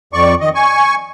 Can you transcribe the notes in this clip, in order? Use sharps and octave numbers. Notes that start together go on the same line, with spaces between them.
F2 D5 C#6
D#3 D#5
G#5 C#6